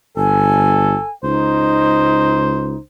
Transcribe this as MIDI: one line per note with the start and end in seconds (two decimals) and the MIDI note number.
0.17 0.95 31
0.17 1.10 69
0.17 1.11 80
1.24 2.75 37
1.24 2.77 63
1.24 2.82 72